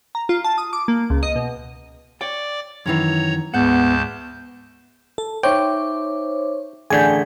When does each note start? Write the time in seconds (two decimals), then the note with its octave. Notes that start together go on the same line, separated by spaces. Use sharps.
0.15 A#5
0.29 F4
0.44 A5
0.58 D#6
0.73 D6
0.88 A#3
1.10 C#2
1.23 D#5
1.36 B2
2.21 C#5 D5 G5 D6
2.86 F#2 D#3 E3 C#5 A#5
3.54 D2 G#2 B3 F#5 A5 G6
5.18 A4
5.43 D#4 C5 C#5 E5 G5 D6
6.90 A1 D3 G#4 G#5 G6 B6